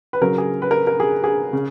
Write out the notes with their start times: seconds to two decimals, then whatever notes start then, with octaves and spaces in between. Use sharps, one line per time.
0.13 B4
0.21 C#3 F#3 A#4
0.38 G#4
0.62 B4
0.71 A#4
0.87 A#4
1.00 G#4
1.24 G#4
1.53 C#3